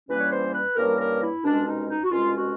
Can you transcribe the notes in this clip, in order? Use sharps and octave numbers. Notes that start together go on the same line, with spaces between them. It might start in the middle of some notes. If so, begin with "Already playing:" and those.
G2 E3 G3 A#3 C#4 B4
C#5
C5
B4
G2 E3 G3 A#3 C#4 A#4
A#4
E4
C2 B2 G#3 C#4 D4
D#4
D#4
F#4
C2 B2 G#3 C#4 F4
F#4